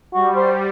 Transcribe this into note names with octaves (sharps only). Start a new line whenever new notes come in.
G3 F#4
C5